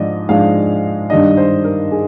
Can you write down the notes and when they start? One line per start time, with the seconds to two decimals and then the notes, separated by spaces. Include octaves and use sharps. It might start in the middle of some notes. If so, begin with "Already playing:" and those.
Already playing: G#2 F3 G#3 D4 D5 D#5
0.29 G#2 F3 G#3 D4 F5
1.10 G2 D#3 G3 D4 D#5
1.37 C5
1.64 A#4
1.92 G#4